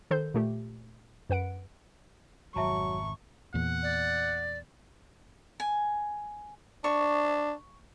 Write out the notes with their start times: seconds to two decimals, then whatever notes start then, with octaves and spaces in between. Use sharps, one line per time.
0.11 D#3 A4 C5 G6
0.34 A#2 A3 G4
1.30 F#2 B4 F#5 D7
2.56 G#1 F2 B2 F#3 E5 A5 A#5 C#6
3.54 E2 A#2 F#5
3.83 D5
5.60 G#5
6.84 D4 C#6